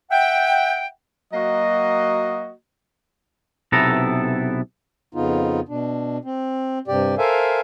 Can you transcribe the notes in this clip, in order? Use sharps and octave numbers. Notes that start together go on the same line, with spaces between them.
E5 F#5 G5
F#3 A#3 F#4 D#5
B1 C3 B3 E4 A4 A#5
F2 C#3 B3 D#4 F4
B2 D4
C4
G2 C3 G4 D5
A4 A#4 C5 E5 F5 G#5